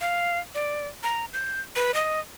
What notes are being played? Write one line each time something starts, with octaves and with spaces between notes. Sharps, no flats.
F5
D5
A#5
G6
B4
D#5